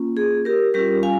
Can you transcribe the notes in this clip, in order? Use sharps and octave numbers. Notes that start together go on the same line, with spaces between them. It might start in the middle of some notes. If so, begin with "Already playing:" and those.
Already playing: A#3 C#4 F4
G#4
G4 A#4
G3 C#4 F4 G4 A#4
F5 G#5